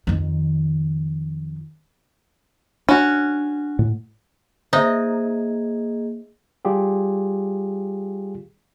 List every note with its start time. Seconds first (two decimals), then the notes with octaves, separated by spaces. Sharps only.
0.07 F2 D#3
2.89 C#4 D4 F#4
3.79 A2
4.73 A#3 D#4 G#4 C5 D#5 E5
6.65 G3 F4 G4 G#4